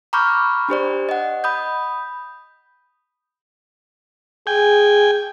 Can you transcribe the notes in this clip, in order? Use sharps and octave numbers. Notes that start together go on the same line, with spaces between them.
A#5 B5 C#6 D6 F6 G6
D4 G4 C5 D5
D#5 F#5
B5 D#6 G6
G#4 G5 G#5